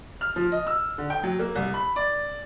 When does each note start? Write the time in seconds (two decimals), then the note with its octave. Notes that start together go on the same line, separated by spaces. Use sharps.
0.21 F6
0.36 F3
0.52 D#5
0.67 E6
0.98 D3
1.10 G5
1.23 F#3
1.39 A#3
1.56 C2
1.74 B5
1.96 D5